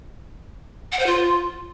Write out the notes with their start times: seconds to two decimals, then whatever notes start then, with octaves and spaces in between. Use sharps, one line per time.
0.92 F#5
0.99 C5
1.06 F4